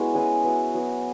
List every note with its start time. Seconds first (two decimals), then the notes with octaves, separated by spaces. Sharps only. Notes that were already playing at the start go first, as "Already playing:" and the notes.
Already playing: G#3 B3 E4 F#4 C#5
0.14 C#4 G#4 B4 E5
0.44 B3 F#4 E5
0.74 F#3 B3 F#4